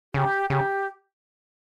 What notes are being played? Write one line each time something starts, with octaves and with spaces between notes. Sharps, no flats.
C#3 G4
C#3 G4